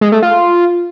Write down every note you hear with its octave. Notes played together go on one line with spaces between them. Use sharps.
G#3
A3
F4